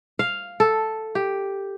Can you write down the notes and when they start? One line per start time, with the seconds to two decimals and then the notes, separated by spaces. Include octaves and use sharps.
0.19 F5
0.60 A4
1.15 G4